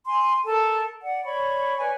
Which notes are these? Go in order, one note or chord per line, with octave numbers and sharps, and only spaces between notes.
G#5 C6
A4 A#4 A5
D5 F#5
C#5 D5 B5 C#6
B4 C#5 D5 G#5